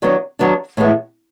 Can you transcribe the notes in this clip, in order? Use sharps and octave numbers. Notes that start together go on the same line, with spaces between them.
D#3 F#3 B3 D4
D#3 F#3 B3 D4
A2 E3 G#3 B3